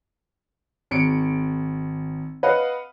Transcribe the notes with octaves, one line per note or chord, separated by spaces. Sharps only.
G#1 C#7 D7
B4 D#5 F5 F#5